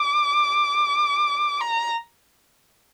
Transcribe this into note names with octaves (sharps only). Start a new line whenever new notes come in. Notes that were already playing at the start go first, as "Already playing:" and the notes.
Already playing: D6
A#5